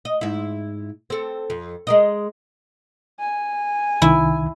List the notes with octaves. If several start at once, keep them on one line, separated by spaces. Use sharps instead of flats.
D#5
G#2 E4
C4 A4
F2
G#3 A#4 D#5
G#5
C2 D#3 E4